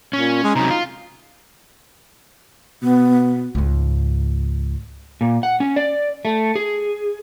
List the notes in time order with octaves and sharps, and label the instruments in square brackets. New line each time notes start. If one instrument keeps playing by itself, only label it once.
[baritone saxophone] A#2 [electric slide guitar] C#4
[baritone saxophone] G#3
[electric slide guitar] C3 F#3 [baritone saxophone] D#4
[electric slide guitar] F4
[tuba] B2 [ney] B3
[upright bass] C#2 G#2
[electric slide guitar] A#2
F#5
C#4
D5
A3
G#4